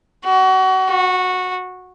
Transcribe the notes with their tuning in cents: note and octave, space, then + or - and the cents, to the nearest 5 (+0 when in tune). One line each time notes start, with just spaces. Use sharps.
F#4 +30
F#4 -15